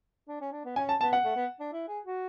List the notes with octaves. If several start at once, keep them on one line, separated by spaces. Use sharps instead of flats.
D4
C#4
D4
B3
C#4 G#5
A5
B3 A5
F#5
A3
B3
D4
E4
G#4
F#4